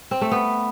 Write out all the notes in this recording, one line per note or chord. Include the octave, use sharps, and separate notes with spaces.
C4
A3
B3